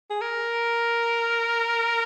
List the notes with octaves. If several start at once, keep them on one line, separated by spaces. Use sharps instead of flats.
G#4
A#4